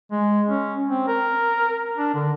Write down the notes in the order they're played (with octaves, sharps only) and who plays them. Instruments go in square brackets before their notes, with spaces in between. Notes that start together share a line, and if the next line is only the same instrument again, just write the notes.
[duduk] G#3
C#4
C4
A#4
D4
D3